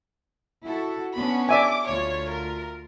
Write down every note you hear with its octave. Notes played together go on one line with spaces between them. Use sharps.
E4 F#4 A4
B3 C#4 D4 B5
D5 E5 G#5 D6
D2 F4 C#5
A#4